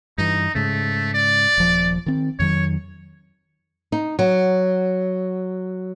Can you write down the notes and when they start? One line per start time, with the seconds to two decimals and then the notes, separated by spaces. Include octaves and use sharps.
0.18 G2 E3 D#4
0.55 G#2 C#3 A3
1.14 D5
1.58 D#1 F3
2.06 D#3 C4
2.39 F2 D#3 F#3 C#5
3.92 D#4
4.19 F#3